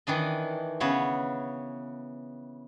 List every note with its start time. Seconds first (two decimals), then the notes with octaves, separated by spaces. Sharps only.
0.07 D#3 E3 D4 D#5
0.80 C#3 B3 C#5 E5